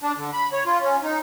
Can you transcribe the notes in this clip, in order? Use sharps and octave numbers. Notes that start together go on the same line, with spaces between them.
D4
D3
B5
C#5
F4
C#4
D#4